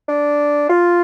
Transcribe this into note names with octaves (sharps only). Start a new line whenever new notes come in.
D4
F4